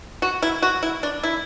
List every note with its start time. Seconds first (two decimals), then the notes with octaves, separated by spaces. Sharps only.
0.22 F#4
0.42 E4
0.62 F#4
0.83 E4
1.03 D4
1.23 E4